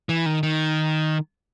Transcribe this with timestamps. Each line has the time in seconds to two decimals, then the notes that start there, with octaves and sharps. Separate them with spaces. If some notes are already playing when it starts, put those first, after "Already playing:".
0.09 E3
0.26 D#3
0.43 D#3